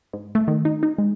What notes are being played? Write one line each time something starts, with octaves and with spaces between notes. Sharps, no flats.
G#2
A3
D#3
D#4
D#4
G#3